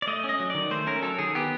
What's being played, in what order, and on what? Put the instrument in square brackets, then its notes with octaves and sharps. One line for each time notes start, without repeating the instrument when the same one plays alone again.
[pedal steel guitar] D5
A3 D#5
C#4
D#5
F#3
D#3 D5
A3 C5
C#4 A#4
F#3 A4
D#3 G#4
B3 G4